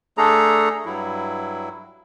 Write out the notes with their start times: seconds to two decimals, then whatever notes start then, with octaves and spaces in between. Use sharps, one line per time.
0.18 A3 D4 G#4 A4 A#5
0.86 G2 F#3 E4